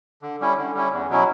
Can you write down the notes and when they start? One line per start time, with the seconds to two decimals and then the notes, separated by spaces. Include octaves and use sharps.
0.22 D3
0.40 G3 C#4 E4
0.57 D3
0.74 G3 C#4 E4
0.93 E2
1.10 B2 F#3 C#4 E4